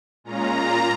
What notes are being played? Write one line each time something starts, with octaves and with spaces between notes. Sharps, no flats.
A#2 G#3 C#4 F4 A#5
A#2 A#3 F4